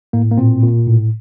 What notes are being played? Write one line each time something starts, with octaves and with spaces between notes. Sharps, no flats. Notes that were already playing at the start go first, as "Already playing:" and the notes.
A2 A#3
A#3
A#2 C4
A#2
A2